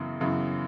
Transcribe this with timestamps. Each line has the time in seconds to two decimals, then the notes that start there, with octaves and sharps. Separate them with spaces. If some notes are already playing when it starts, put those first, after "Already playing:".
Already playing: F#2 C#3 E3 B3
0.21 F#2 C#3 E3 B3